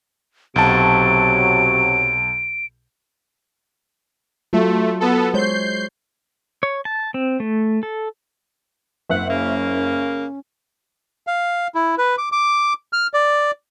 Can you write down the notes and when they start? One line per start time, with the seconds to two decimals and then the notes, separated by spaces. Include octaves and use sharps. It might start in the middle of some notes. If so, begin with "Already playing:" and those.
0.56 B1 C3 F#3 A5 D7
4.53 F#3 A3 F4
5.00 B3 A4
5.34 G#3 C5 C#5 G6 C7
6.63 C#5
6.85 A5
7.14 C4
7.40 A3
7.83 A4
9.09 F#1 C4 E5 F#5
9.29 C#3 A#3 C#4
11.27 F5
11.75 E4
11.98 B4
12.18 D6
12.32 D6
12.93 F6
13.14 D5